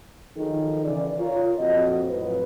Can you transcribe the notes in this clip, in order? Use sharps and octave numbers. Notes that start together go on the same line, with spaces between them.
D#3 F3 F#3 D#4 G#4 A4
C#3 E3 D5
F4 A#4 C#5
F2 A#2 F#4 D#5
F2 A2 F#3 B4